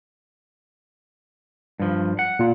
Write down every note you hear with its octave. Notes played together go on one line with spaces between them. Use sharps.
G2 F3
F#5
A#2 F4